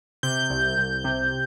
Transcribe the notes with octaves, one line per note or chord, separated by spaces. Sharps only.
C3 G6
C2
C2
C3